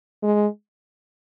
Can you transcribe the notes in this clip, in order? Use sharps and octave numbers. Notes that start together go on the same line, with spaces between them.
G#3